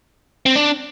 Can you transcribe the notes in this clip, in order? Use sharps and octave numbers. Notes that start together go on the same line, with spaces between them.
C4
D4